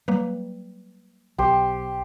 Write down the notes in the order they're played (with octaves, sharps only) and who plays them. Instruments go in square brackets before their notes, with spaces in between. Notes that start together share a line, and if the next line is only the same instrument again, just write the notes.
[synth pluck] F#3 A#3 B4 [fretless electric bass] G3
[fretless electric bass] B1 [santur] G4 C5